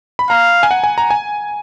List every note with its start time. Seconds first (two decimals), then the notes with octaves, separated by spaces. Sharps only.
0.19 B5
0.30 F5 A#5
0.63 G#5
0.71 F#5
0.84 G#5
0.98 A#5
1.10 G#5